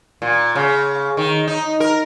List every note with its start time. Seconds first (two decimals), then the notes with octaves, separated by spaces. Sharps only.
0.22 A#2
0.56 C#3
1.17 D#3
1.48 D#4
1.80 A#4